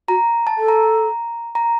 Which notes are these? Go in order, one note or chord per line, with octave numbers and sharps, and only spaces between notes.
F#4 A#5
A5
A4
A#5
A#5